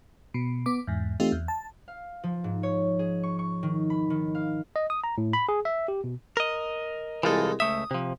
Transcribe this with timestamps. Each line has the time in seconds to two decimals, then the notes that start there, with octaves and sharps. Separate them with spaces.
0.34 B2
0.66 B3 D6
0.87 E2 G#2
1.20 E3 A3 C4 D#4 F4 G4
1.32 E2
1.48 A5
1.88 F5
2.24 F3
2.44 G#2
2.63 C#5
2.99 G#4
3.23 C#6
3.39 C#6
3.63 D#3
3.90 B5
4.10 D#3
4.35 F5
4.76 D#5
4.90 D#6
5.04 A#5
5.18 A2
5.33 B5
5.49 G#4
5.65 E5
5.88 G4
6.04 B2
6.37 A#4 D#5
7.23 C2 E3 G#3 F4 A4
7.60 C#2 A3 E5 D#6
7.91 C3 F3